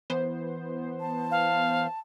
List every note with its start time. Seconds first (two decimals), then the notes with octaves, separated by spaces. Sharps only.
0.10 E3 B3 C5
1.00 A5
1.31 F5